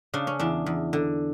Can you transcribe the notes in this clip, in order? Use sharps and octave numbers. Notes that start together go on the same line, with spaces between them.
C#3 D4
C#4
E2 D4
E2
D3